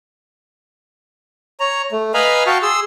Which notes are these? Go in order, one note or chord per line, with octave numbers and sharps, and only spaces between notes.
C#5 A#5
A3
B4 D#5 F5 G#5 A#5 B5
F#4 F5 G5 A5 C#6
G#4 C6 E6